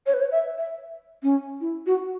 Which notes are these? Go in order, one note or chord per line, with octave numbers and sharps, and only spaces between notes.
C#5
B4
C#5
E5
E5
C#4
E4
F#4